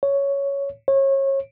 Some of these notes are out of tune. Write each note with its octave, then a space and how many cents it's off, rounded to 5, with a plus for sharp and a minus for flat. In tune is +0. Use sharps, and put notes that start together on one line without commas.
C#5 +5
C#5 -30